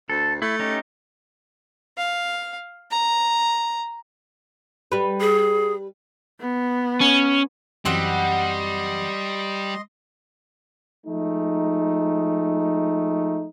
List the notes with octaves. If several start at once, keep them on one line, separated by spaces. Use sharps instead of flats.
D2 A4
A3 E4
C#4 D#4 G4
F5
A#5
G3 B4
G#4
B3
C#4
F#2 E3 F#3 G3 C4 D#5 F#5 C6
F3 G#3 A3 D#4